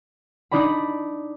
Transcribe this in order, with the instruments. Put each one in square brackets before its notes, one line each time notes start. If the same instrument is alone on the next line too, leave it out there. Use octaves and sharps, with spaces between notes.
[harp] D4 D#4 D5 A#5 B5